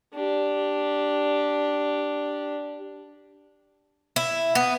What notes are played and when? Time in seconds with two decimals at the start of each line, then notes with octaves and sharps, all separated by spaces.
0.15 D4 G4
4.16 E4
4.55 B3